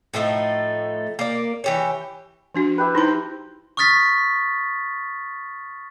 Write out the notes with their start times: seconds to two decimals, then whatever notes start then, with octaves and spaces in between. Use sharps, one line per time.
0.14 A2 F3 A3 D#4
1.19 A#3 D5
1.64 E3 G4 C#5
2.55 F3 D4 F#4
2.78 E4 G4 B4
2.95 D#4 E4 C5 C6
3.77 C#6 D#6 F6 A6 B6